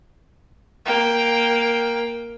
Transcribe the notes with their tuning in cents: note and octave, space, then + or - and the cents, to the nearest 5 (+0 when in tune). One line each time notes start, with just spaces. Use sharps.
A#3 +5 G5 +0